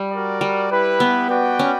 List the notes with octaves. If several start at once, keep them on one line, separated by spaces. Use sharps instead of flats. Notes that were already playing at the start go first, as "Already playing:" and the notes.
Already playing: G3
F#4 A#4 D5
G3
E4 G4 B4
B3
F#4 B4 D5 G5
C#4